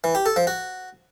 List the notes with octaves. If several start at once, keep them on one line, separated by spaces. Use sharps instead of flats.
E3
G4
A4
F3
F#4